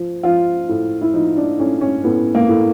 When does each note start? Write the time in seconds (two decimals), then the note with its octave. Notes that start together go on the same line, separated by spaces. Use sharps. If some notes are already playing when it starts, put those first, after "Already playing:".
Already playing: F3
0.23 F3 F4
0.69 A2
1.01 E4
1.13 F3 D#4
1.37 D4
1.59 A2 C#4
1.81 C#4
2.04 A2 B3
2.35 A#3
2.49 A2